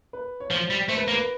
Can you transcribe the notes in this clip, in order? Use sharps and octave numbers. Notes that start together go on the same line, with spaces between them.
B4
C#5
F3 C5
G3
A3 C5
B4
A#3 A#4
B4